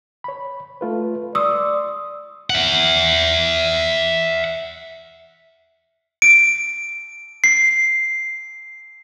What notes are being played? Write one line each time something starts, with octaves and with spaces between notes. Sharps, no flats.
C#5 B5
A3 F4 B4
D5 C6 C#6 D#6 E6
E5 F#5
D7
C7